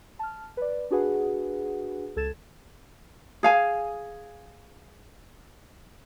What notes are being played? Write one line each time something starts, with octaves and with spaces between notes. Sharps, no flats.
A5 F6
B4 D5
D4 F#4 G#4 B4 F#5
C#2 A4 G#6 A6 E7
G#4 F5 G#5